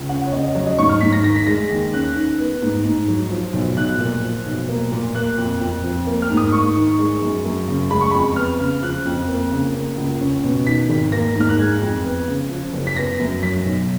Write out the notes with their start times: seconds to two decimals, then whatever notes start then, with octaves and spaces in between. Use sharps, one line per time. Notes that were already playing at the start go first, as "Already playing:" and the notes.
Already playing: C#2
0.09 C#4 F#5
0.26 C#5
0.32 C#3 D#5
0.43 D#5
0.55 F#3 C#5
0.67 D#5
0.78 G#2 C#6
0.89 F6
1.01 G#2 B6
1.13 A#6
1.24 D#3 A#6
1.36 B6
1.47 G#3 A#6
1.70 D#2
1.93 C#4 F#6
2.15 D#3
2.39 B3
2.62 G#2
2.85 G#2
3.08 F#3
3.31 F3
3.53 B1
3.77 B1 F#6
4.00 A#2
4.23 F3
4.46 B1
4.69 A#3
4.92 A#2
5.15 A#3 F#6
5.38 F2
5.61 F2
5.84 F3
6.07 A#3
6.22 F6
6.30 G#2
6.37 D#6
6.52 G#2 C#6
6.76 D#3
6.99 G#3
7.22 F#2
7.45 F#2
7.68 C#3
7.91 G#3 B5
8.01 C#6
8.11 F2 B5
8.36 B3 F6
8.60 C#3
8.83 F3 F#6
9.06 F2
9.28 A#3
9.52 C#3
9.74 A#3
9.97 C#2
10.21 C#4
10.44 B2
10.66 D#3 B6
10.89 G#1
11.12 A#3 A#6
11.36 G#2
11.41 F6
11.49 F#6
11.58 G#3 G#6
11.82 F2
12.05 B3
12.28 C#3
12.50 F3
12.73 F#1
12.87 B6
12.96 B3 A#6
13.19 F#2
13.42 F#3 B6
13.65 B1